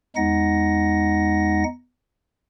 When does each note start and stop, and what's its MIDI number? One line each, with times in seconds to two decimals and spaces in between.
0.16 1.64 40
0.16 1.64 56
0.16 1.64 63
0.16 1.64 78
0.16 1.64 94